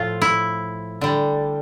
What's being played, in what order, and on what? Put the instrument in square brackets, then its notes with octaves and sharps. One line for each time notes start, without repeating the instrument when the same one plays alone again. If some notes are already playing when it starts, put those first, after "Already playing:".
Already playing: [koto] A2 F3 A3 F4
E4
D3 G3